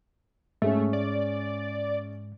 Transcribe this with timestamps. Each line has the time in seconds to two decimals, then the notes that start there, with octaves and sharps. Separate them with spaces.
0.62 G#2 G#3 A3 C#4 G#4 E5
0.93 D5